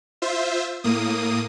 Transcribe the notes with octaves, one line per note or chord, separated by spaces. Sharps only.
F4 C5 E5
A2 A#3 D#6